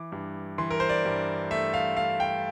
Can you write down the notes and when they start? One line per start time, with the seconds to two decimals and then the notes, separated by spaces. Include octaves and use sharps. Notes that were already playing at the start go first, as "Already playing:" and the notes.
Already playing: E3 D6
0.12 G2
0.58 E3 C6
0.70 A#4
0.80 C5
0.89 D5
1.05 G2
1.51 A3 E5
1.74 F5
1.97 A3 F5
2.20 G5